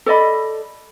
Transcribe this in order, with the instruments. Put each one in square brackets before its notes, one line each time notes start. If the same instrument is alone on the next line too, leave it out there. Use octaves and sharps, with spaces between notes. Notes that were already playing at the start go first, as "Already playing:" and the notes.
[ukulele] A4 D5 D#5 B5